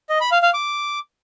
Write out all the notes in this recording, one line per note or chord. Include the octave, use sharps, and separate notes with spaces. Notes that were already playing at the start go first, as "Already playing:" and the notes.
D#5
B5
F5
F5
D6